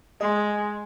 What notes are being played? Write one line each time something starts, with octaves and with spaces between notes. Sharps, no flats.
G#3 D#5 C6